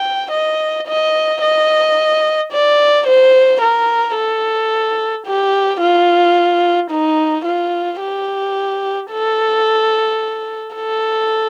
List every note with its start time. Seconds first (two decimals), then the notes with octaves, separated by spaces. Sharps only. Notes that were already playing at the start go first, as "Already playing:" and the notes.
Already playing: G5
0.31 D#5
0.87 D#5
1.42 D#5
2.52 D5
3.07 C5
3.61 A#4
4.16 A4
5.27 G4
5.81 F4
6.91 D#4
7.45 F4
8.01 G4
9.11 A4
10.75 A4